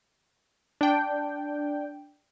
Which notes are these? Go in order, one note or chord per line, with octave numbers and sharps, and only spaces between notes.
D4 G5